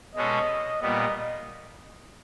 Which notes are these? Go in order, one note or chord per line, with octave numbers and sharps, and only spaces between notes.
B2 G#3 C#4 F#4 A4 D#5
A#2 G3 B3 D#5